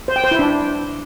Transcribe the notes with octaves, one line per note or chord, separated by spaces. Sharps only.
C5
G5
C5
E4
D4